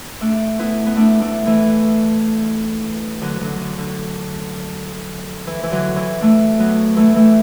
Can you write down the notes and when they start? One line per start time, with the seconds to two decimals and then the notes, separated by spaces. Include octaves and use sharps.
0.21 A3 D4
0.59 B3 E4
0.87 B3
0.96 A3 D4
1.21 A3 D4
1.46 E3 A3
3.21 D3 F#3
3.40 D3 F#3
3.59 D3
3.78 D3
5.47 E3
5.63 E3
5.71 D3 F#3
5.96 E3
6.21 A3 D4
6.59 F#3 B3
6.96 E3 A3
7.15 E3 A3